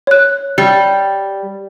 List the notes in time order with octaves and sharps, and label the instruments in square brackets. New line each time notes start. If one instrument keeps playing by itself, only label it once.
[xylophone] C#5 F#6
[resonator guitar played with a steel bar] G3